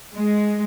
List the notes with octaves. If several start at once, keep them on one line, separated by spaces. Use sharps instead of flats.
G#3